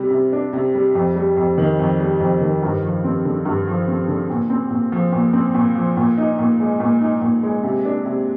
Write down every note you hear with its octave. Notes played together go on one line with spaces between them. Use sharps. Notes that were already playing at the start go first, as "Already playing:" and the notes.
Already playing: C3 G3
C3
D4
C3
G3
F2
G3
F2
D#3
F2
G3
F2
D#3
G2
F3
C4
D3
G2
F3
C4
D3
A#2
C4
A#2
F3
A#2
C4
A#2
F3
A#2
D#4
A#2
G#3
A#2
D#4
A#2
G#3
C3
D4
C3